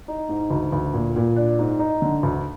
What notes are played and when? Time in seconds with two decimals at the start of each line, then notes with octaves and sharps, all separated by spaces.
0.08 D#4
0.29 G#2
0.51 D2
0.72 D2
0.94 A#2
1.16 A#2
1.36 D4
1.59 G#2
1.79 D#4
2.02 D3
2.23 D2